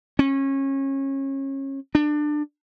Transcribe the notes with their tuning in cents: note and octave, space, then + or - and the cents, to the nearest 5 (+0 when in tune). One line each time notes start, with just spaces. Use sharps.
C#4 -30
D4 +20